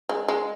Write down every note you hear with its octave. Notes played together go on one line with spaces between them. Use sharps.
G#3
G#3